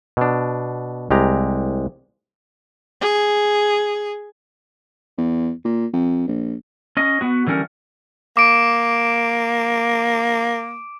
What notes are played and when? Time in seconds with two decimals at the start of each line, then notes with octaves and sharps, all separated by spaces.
0.17 B2 D4
1.11 C2 G#3 G4 A#5
3.01 G#4
5.17 E2
5.64 A#2
5.93 F2
6.27 A#1
6.97 C#4 D#5
7.21 B3 F#4
7.47 D3 E3 G3 C#4 A#4
8.37 A#3 D6 D7